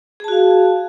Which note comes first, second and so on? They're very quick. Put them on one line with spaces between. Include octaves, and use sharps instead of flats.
G#4 A5 F#4 F5